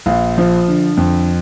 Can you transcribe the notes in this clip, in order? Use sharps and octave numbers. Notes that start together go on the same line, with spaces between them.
A#1 F5
F3
D3
F2